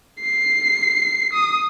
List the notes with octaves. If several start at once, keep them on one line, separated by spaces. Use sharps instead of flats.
C7
D#6